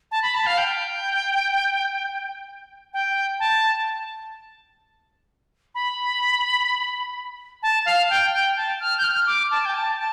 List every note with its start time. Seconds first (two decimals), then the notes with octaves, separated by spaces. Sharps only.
0.11 A5
0.22 B5
0.35 A5
0.46 F5
0.58 G5
2.93 G5
3.40 A5
5.75 B5
7.63 A5
7.86 F5
8.10 G5
8.33 G5
8.56 A5
8.80 F6
8.98 G6
9.04 F6
9.27 D6
9.51 A5
9.65 G5
9.74 A5
9.98 A5